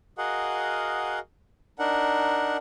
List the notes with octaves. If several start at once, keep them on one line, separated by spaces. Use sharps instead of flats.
F#4 G#4 A#4 D#5 F5 F#5
D4 D#4 A#4 F#5